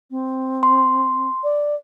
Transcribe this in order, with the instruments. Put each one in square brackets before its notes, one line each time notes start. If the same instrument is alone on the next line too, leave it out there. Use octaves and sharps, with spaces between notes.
[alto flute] C4
[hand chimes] C6
[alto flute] D5